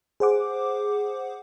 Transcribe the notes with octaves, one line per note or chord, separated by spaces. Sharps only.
G#4 C5 F#5 D6